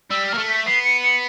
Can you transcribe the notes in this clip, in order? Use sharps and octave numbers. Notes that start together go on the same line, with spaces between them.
G3 E6
A#3 F6
A3
B6
B3 C7
C#7
C#7